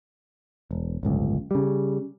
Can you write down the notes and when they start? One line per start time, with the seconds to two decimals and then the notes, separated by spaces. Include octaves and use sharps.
0.71 E1
1.03 D1 G1 C#2
1.51 C#3 G3